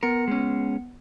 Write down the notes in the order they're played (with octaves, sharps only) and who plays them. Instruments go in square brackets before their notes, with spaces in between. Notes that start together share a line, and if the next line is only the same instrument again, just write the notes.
[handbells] B3 C#7 [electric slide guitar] A#4
[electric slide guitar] G#3 C#4